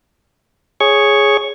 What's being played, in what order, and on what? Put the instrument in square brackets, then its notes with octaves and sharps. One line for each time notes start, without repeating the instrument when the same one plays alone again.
[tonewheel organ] G#4 C#5 C#6